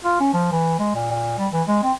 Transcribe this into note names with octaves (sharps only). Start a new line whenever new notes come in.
F4
C#4
F3
E3
G#3
A#2
A#2
G3
E3
G#3
C4